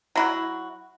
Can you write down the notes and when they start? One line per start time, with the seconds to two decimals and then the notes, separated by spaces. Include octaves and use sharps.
0.16 F#3 E4 F#4